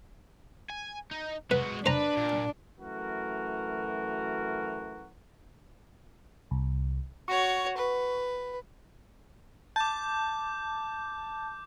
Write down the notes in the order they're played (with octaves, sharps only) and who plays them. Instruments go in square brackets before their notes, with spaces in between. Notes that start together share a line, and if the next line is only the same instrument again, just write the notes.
[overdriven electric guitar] G#5
D#4
[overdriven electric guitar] G#3 F#4 [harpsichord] B4
[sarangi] D4 [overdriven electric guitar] B4 [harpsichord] C5 A#5
[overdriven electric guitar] A#2
[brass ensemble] F#2 E3 A3 F#4 A#4
[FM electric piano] C2
[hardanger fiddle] F#4 C#5 [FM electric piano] C#6
[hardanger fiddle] B4
[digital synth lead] A5 [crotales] D6 G6